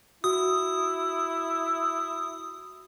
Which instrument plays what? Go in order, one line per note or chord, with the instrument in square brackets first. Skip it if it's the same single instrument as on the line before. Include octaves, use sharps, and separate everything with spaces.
[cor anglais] E4 [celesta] F#4 [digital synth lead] D#6